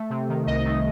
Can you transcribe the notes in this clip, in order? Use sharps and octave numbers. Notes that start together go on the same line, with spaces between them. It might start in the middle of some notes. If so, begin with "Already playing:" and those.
Already playing: A3
C3
D#3
C2 D#5
A3